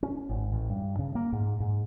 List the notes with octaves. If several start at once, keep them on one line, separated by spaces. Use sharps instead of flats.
C#4
G#1
A1
G2
C#3
A#3
G#2
G#2